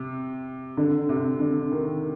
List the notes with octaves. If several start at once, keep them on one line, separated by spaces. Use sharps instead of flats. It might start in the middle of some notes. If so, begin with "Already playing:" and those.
Already playing: C3
D3
C3
D3
D#3